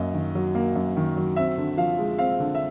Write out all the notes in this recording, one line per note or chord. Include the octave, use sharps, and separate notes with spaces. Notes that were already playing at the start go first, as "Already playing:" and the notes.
Already playing: F#2 A#3 D#5
D#3
F#3
A#3
F#2
D#3
F#3
C4 E5
D3
F3 F5
G#3
C4 F5
D3
E5